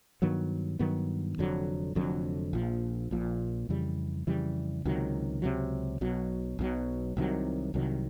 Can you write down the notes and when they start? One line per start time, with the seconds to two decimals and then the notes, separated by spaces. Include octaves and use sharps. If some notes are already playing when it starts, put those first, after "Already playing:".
0.22 G2 D#3 F#3 B3
0.79 G2 D#3 F#3 B3
1.38 F1 F2 D3 F#3
1.95 F1 F2 D3 F#3
2.53 A#1 A#2 F3
3.11 A#1 A#2 F3
3.69 F2 C#3 E3 G3
4.27 F2 C#3 E3 G3
4.85 C#2 C3 D#3 F#3
5.42 C#2 C3 D#3 F#3
6.01 B1 B2 F#3
6.59 B1 B2 F#3
7.17 C2 C3 D#3 F#3
7.74 C2 C3 D#3 F#3